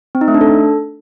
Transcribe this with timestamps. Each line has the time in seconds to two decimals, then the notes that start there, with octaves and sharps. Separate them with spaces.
0.15 C4
0.21 D#4
0.28 A3
0.34 D4
0.41 A4